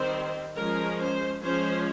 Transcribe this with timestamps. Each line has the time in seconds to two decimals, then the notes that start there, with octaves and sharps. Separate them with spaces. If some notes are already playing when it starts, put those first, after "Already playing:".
Already playing: D#3 G3 C4 C5
0.55 F3 G#3 C#4 A#4
0.99 C5
1.42 F3 G#3 C#4 C5